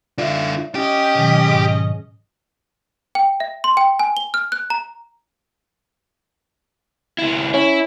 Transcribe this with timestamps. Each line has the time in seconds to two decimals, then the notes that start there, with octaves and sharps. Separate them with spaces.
0.18 D3 F4 D5 E5
0.75 C#4 G4 D#5
1.15 B2 D#3 F#3
1.47 G#2
3.15 G5
3.40 E5
3.64 C6
3.77 G5
3.99 G#5
4.17 G7
4.34 F6
4.52 F#6
4.70 A#5
7.18 C#2 E4
7.54 C#4 E4